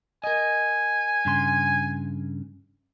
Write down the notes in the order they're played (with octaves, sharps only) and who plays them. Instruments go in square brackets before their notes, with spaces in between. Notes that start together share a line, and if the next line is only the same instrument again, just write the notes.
[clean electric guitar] A#4 D#5 [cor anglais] G#5
[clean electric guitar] G2 C#3 C6